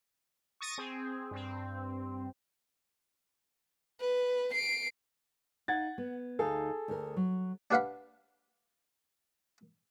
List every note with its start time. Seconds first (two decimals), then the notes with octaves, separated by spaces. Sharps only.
0.61 C#6 D#6 A6 A#6 D#7
0.78 C4 G#4
1.31 G2 C4
4.00 B4
4.54 C7 D7
5.68 D#4 F5 F#5 G#6 A6
5.98 B3
6.39 D2 D#4 G#4 A4 F5
6.88 D2 A#4
7.17 F#3
7.71 D4 G4 B4 F5 F#5 B5